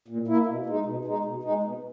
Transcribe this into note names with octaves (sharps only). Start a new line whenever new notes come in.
A#2
A#3 E4
B2
G#3 D#4
B2
G#3 D#4
B2
G#3 D#4
B2